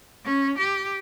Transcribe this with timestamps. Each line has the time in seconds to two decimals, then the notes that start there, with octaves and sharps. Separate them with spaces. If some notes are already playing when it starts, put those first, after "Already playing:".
0.25 C#4
0.59 G4